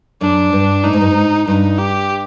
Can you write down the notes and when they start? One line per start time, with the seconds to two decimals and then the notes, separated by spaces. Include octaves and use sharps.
0.21 F#2 D4
0.53 G2
0.84 A2 D#4
0.93 G#2
1.01 G2
1.11 G#2
1.47 G2 D#4
1.79 G4